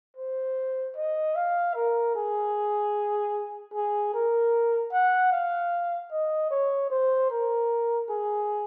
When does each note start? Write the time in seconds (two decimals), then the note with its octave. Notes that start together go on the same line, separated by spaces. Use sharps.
0.17 C5
0.96 D#5
1.36 F5
1.75 A#4
2.15 G#4
3.74 G#4
4.14 A#4
4.92 F#5
5.32 F5
6.12 D#5
6.51 C#5
6.90 C5
7.30 A#4
8.10 G#4